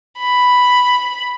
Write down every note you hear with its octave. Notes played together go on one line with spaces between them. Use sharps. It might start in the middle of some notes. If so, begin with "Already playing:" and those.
B5